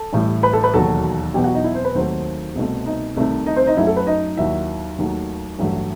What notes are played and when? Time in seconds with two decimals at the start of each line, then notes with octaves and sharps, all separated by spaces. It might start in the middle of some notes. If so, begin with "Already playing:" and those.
Already playing: A4 A5
0.13 A1 A2 G3
0.43 B4 B5
0.53 A4 A5
0.63 B4 B5
0.74 E1 D#2 D#3 F#3 A4 A5
1.34 E2 B2 F#3 G4 G5
1.44 F#4 F#5
1.54 D#4 D#5
1.64 E4 E5
1.75 C4 C5
1.85 B4
1.95 D#2 D#3 F#3 A3 C4 C5
2.55 C2 B2 A3
2.86 D#4 D#5
3.16 C2 C3 D#3 A3
3.47 D#4 D#5
3.56 C4 C5
3.67 D#4 D#5
3.77 F#2 F#3 A3 E4 E5
3.87 A4
3.96 B4
4.07 D#4 D#5
4.37 D#2 D#3 F#3 E4 E5
4.98 D#2 D#3 F#3 A3
5.59 A1 G2 F#3 A3